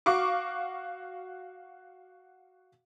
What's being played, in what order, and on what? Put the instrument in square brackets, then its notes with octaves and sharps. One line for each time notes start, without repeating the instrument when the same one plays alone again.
[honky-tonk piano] F#4 F5 C#6 D6